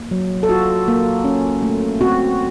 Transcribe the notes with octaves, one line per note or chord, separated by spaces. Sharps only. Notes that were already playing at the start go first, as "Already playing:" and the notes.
Already playing: A#3
F#3
A4
F4 F#4
A#3
C#4
A3
C4 F#4